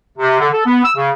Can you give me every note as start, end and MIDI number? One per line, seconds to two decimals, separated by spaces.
0.17 0.37 48
0.39 0.47 50
0.52 0.62 69
0.66 0.82 59
0.84 0.94 88
0.96 1.10 49